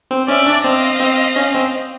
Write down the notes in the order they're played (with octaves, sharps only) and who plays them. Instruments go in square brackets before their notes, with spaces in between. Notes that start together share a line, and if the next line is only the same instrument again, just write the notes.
[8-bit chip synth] C4
[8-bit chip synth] C#4 [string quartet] D5 E5
[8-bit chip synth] D4
[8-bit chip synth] C4 [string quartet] D#5 F5
[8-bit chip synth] C4
C#4
C4